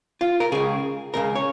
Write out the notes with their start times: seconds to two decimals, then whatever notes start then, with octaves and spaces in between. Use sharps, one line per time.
0.21 F4
0.40 A#4
0.52 C#2 C#3 G#4
1.14 C#2 C#3 A#4
1.35 C#5